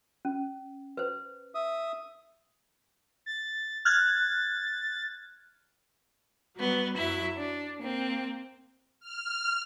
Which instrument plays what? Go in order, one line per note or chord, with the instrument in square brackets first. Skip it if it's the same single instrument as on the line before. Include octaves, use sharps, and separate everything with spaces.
[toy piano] C#4
B4 C5
[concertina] E5 D#6
[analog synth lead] A6
[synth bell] F6 F#6 G#6 [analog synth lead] A6
[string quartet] F#3 G3 B3
F#2 F#3 E4 E5
D4
A#3 C4
[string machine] F6